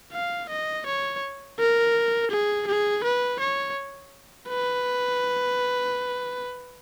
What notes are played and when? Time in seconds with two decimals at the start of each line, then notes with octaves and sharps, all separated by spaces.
0.13 F5
0.49 D#5
0.86 C#5
1.59 A#4
2.31 G#4
2.67 G#4
3.03 B4
3.40 C#5
4.49 B4